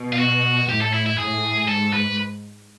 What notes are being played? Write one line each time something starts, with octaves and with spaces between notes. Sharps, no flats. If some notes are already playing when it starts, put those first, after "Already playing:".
Already playing: B2
F4
F#4
A2 G4
A4
E4
E4
A2 G#4
G#2 A4
B4